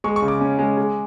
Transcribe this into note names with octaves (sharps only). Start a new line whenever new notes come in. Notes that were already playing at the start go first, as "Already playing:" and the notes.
G#3 C#6
C#6
C#3
D6
C#4
G#3
G#3